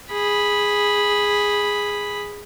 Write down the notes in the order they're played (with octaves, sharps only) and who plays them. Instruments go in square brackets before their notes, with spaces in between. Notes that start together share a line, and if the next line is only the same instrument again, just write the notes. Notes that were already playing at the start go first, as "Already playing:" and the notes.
[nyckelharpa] G#4 B5